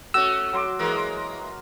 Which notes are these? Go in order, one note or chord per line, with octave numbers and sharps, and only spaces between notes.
A3 C#4 F#4 E6
F#3 C6 D6
E3 G#3 A#3 A#4